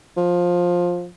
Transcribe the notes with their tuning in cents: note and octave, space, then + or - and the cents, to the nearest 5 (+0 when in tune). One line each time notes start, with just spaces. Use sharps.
F3 +15